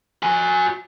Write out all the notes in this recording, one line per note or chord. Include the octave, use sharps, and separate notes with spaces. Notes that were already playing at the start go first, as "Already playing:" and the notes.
F#4 G#5